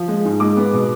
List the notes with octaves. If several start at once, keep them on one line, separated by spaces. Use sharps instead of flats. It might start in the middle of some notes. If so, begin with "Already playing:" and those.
Already playing: F3
G#3
G#2
G#3 D6
B3
B2